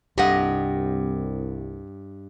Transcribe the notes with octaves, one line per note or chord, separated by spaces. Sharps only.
C2 G2 G4 D#5 F#5